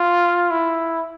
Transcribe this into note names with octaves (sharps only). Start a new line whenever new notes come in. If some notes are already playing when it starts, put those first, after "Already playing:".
Already playing: F4
E4